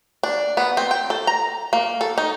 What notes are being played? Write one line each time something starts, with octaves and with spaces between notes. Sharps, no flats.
D4
B3
C4
G5
A4
A#5
A#3
A4
D#4